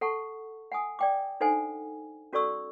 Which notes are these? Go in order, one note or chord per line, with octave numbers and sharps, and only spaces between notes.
A4 F#5 A5 C#6
F#5 G#5 D#6
D5 G5 D6
D4 D#4 A4 C5 F#5 G#5
C#4 F#4 A4 D5 C#6 E6